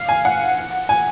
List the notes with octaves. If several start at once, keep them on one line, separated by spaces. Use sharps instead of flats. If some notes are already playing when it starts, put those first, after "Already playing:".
Already playing: F5
G#5
F#5
G#5